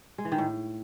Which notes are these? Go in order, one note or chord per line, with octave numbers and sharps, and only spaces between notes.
G#3
E3
D#3
A2